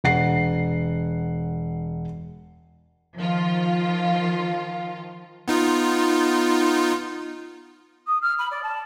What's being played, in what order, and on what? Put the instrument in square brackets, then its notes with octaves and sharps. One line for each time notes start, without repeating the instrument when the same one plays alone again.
[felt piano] E1 F#5 C7
[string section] D#3 F3 F4
[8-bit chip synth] B3 D#4 F4
[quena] D#6
F6
B5
D5
A5